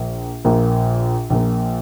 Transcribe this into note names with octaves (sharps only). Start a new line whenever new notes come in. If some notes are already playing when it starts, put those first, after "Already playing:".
Already playing: A#1 A#2 A#3
A#1 A#2 A#3
A#1 A#2 A#3